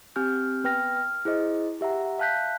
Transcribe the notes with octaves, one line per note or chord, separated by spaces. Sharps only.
C4 G4 G#5 F6 G6
B3 B4 G5 F6 A#6
F6
E4 G#4 C5 D#5
G4 E5 F#5 A#5
E5 F5 A5 F#6 G6 B6